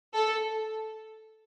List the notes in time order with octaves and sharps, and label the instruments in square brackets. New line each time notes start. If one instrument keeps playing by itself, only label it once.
[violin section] A4